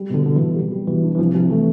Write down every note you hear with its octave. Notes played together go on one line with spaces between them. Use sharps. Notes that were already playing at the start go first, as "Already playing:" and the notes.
Already playing: G3
B2 D3
B2 D3
B2 E3
G3
G3
B2 E3
D4
E3
C2 F3
C2
E3 A3